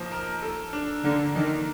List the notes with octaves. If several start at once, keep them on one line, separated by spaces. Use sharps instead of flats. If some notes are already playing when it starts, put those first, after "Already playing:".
Already playing: F3 A#3 D#4
A#4
A4
D4
D3 A#3
D#3 A#3